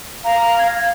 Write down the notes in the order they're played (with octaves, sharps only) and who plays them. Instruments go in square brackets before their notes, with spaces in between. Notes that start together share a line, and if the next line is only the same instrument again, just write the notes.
[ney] F5 [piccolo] A#5
[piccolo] G#6